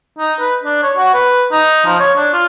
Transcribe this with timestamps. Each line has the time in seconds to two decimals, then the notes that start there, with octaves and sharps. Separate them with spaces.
0.18 D#4
0.40 B4
0.64 D4
0.83 C#5
0.97 F#4
1.14 B4
1.52 D#4
1.86 F3
2.00 C#5
2.17 D4
2.33 F4